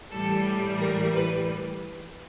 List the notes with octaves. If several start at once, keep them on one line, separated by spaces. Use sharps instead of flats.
A2 E3 G3 A4
A#4
B4